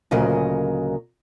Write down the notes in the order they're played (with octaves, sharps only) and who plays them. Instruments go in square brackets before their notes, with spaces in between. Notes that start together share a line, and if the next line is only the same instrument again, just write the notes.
[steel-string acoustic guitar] D2 A#2 C#3 F#3 A#4 D#5